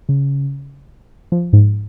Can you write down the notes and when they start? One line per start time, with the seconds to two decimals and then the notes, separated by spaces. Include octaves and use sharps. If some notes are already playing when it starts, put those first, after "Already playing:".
0.09 C#3
1.32 F3
1.53 G#2